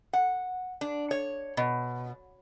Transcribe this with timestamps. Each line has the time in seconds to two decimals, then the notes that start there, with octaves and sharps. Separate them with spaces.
0.13 F#5
0.81 D4
1.11 C#5
1.57 B2